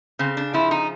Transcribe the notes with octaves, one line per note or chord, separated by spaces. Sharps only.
C#3 C4
D4
F3 E4
D#4